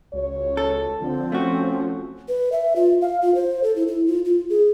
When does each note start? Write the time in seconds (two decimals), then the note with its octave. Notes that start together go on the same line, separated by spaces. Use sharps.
0.13 C#2 F#4 C#5
0.57 A4
1.02 D3 F3 C4
1.32 A3 C#4 F#4
2.28 B4
2.52 E5
2.76 F4
3.01 F5
3.22 F4
3.35 C5
3.63 A4
3.76 E4
3.88 E4
4.07 F4
4.25 F4
4.50 G#4